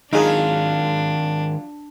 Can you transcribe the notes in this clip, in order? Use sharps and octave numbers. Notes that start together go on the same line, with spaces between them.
D#3 F#3 G#3 D4 D#4 F4 G#4